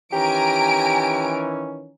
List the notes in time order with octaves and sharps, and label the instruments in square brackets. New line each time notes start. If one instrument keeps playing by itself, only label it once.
[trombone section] D#3 E3 C#4 [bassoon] G4 [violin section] G#5 A#5 D7